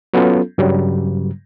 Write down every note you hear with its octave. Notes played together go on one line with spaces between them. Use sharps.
F#3 B3 C#4 F4 A4
G2 C#3 F#3 G3